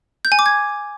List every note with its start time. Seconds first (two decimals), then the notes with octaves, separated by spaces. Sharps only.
0.25 G6
0.32 G#5
0.39 D6
0.46 G#6